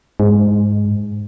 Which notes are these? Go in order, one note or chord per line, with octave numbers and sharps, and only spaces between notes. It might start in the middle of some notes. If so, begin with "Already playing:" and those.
G#2